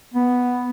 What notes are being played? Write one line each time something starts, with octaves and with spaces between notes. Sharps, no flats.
B3